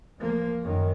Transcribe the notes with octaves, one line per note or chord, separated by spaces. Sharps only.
F3 A#3
F#2 D#3